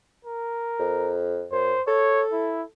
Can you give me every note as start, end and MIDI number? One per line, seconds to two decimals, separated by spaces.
0.25 1.14 70
0.79 1.45 41
1.52 1.73 42
1.52 1.82 72
1.87 2.68 69
1.87 2.24 73
2.32 2.63 64